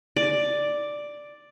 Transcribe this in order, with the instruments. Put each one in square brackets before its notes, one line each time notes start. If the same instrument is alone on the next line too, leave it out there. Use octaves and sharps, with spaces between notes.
[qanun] D5